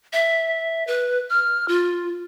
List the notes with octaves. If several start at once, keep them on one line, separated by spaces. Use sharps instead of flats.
E5
B4
F6
F4